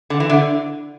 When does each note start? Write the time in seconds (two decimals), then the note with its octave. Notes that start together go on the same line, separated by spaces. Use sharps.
0.10 D3
0.20 E3
0.29 D3